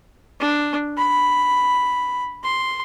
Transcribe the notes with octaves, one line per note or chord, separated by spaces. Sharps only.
D4
B5
C6